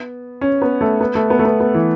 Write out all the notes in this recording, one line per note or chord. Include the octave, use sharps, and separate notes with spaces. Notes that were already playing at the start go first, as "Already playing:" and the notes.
Already playing: B3
C#4
B3
A3
B3
A3
B3
A3
B3
B3
E3